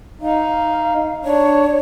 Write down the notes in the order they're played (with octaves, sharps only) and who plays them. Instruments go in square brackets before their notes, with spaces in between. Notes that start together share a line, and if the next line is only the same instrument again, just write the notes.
[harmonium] D#4 [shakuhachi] F5
[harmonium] D4 [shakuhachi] C#5